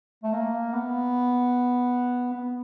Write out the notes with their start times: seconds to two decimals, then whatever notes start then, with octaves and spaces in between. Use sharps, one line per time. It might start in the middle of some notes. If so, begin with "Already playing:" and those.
0.23 A3
0.33 A#3
0.73 B3
2.33 B3